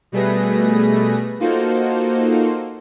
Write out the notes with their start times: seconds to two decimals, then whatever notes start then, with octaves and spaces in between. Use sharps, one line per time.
0.12 B2 G3 A3 G#4 B4 A#6
1.40 A#3 D#4 F4 F#4 A4 C5